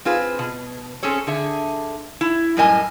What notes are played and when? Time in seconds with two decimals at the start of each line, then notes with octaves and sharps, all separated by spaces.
0.05 C4 F4 G#4 B4
0.39 B2
1.03 C4 C#4 G#4 A4 C#5
1.27 D3 G#4 E5
2.21 E4
2.57 F#2 A2 G3 A#4 D#5 G#5